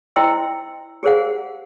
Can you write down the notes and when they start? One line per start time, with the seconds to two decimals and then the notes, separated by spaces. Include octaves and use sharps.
0.16 E4 C5 D#5 G5 C6 E6
1.03 G4 G#4 A#4 C5 F5 F#5